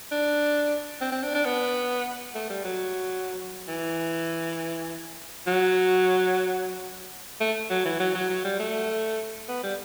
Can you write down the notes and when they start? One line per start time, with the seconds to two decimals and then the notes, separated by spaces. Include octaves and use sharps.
0.12 D4
1.01 C4
1.12 C4
1.23 D4
1.35 D4
1.45 B3
2.35 A3
2.50 G3
2.64 F#3
3.68 E3
5.47 F#3
7.41 A3
7.70 F#3
7.85 E3
8.00 F#3
8.15 F#3
8.30 F#3
8.44 G3
8.59 A3
9.49 B3
9.64 G3